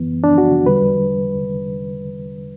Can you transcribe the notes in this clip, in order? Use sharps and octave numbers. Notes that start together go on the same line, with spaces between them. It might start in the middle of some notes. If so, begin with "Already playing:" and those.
Already playing: F#2 E3 B3
D4
F#4
E2 D3 G3 B4